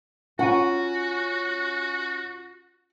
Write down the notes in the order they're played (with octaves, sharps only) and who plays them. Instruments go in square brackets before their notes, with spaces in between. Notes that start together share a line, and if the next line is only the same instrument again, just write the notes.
[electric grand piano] C#4 [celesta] F4 C#6 D#7 [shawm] F#4 [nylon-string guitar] F#5